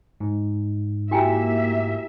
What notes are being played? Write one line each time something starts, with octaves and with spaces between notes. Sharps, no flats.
G#2
A#3 E4 F#4 G4 E5 G5 G#5 A#5